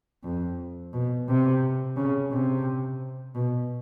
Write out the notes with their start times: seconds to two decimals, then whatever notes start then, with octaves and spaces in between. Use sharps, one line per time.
0.24 F2
0.93 B2
1.28 C3
1.97 C#3
2.31 C3
3.35 B2